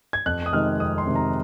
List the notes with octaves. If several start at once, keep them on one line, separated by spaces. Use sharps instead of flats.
G#6
F2 F#6
D#6
C3 D#3 G#3 F6
F2 D#6
C6
C3 D#3 G#3
A#5